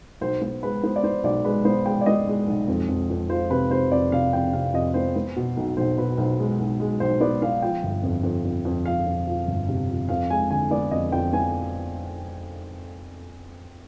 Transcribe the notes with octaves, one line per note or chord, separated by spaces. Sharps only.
B1 C5
B3 C5
G#3 B4
B3 C5
D5
B3 C5
B1 D5
G#3 B4
B3 C5
G#3 G5
D5
B3 D#5
G#3
B1
F2
F2
F2
F3 C5
C3 B4
C3 C5
F2 D5
C3 F5
F2 G5
C3 F5
F2 D#5
B3 C5
B3
B2
B1
B1 C5
B2 B4
B1 C5
G#3
B1
G#3
B1 C5
B3 D5
B3 F5
F3 G5
G1
F2
F2
F2
F2
F3 F5
F2
F3
G1
C3
F3
F2 F5
G#3 G#5
D3 G#5
B3 D5
F2 D#5
F2 G5
B3 G#5